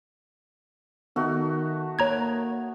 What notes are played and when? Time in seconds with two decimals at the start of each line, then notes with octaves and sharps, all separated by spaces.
1.16 D#3 A3 B3 D#4 F#4
1.99 A#3 C#5 A#5 G#6